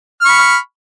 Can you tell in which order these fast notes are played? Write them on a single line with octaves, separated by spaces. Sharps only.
F6 C#6 B5